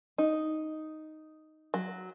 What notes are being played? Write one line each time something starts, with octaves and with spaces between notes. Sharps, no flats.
D#4
F#3